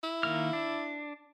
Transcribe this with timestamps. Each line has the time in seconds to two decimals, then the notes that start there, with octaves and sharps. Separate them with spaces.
0.03 E4
0.23 D#3 A#3 F6
0.53 D4